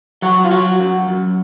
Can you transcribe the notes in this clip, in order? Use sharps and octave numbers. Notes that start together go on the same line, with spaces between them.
F#3 F#4
F4
F#3 F#4
F#2
F#2